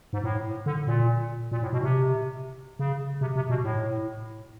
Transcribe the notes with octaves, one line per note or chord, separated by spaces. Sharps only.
G#2
A2
D3
A#2
A#2
A2
B2
C3
C#3
C3
C3
B2
A2